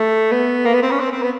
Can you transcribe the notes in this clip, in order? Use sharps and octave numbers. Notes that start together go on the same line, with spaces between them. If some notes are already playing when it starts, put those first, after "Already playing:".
Already playing: A3
B3
A#3
B3
C4
C#4
C4
C4
B3